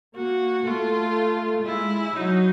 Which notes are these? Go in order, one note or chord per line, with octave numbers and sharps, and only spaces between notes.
A#3 F#4
A3 F4
G#3 E4
F#3 D#4